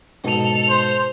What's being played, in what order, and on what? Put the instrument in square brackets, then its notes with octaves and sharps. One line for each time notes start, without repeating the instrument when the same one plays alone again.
[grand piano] G#2 B2 [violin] A4 F7
[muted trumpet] C5